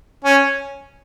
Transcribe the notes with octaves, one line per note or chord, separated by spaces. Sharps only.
C#4